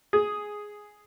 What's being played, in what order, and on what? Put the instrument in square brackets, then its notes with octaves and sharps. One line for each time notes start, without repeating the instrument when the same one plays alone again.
[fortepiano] G#4